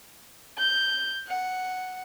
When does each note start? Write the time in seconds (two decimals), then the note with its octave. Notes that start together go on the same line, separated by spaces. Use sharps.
0.58 G6
1.27 F#5